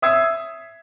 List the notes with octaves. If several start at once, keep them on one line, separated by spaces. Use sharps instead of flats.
E5 D#6 E6 G#6 C7